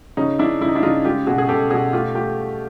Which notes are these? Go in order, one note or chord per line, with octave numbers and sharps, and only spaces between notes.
C#3 C#4 D#4
C#3 D4 E4
C#3 E4
D#4
D4 E4
C#3 D#4 F4
G#3 F4 G4
B2 F#4 G#4
G#4
B2 G4 A4
B2 F#4 G#4
A3 F4 G4
A3 F4 G4